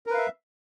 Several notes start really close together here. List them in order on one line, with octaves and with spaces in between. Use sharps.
A#4 B4 F5 E5